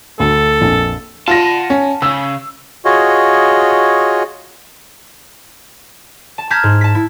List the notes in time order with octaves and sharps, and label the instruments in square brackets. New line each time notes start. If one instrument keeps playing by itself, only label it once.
[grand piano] D2 [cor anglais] A4
[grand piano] A#1 F2
[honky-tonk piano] F4 A#6 [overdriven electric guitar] F#5 A5
[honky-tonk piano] C#4
[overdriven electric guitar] C#3 [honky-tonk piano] E6
[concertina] F4 F#4 G#4 C#5 D#5
[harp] A5
A5 A#5 F6 G6 G#6 B6
G#2
A5 B6
E4